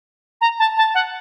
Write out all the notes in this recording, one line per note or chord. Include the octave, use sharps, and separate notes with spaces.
A#5
A5
A5
F#5